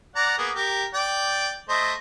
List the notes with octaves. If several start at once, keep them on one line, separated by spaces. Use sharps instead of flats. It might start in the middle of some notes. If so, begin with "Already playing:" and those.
D5 F#5 A#5
A#3 B3 G#4
G4 A#4
D5 G5
A3 C5 D#5